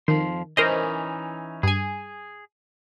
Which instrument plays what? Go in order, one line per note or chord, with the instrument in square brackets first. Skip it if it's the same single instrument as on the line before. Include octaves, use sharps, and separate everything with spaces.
[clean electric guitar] F2 F3 C6 [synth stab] D#3
[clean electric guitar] E3 C#4 D#4 [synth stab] A#4 C5 D#5
[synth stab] G2 G#5 [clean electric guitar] G#4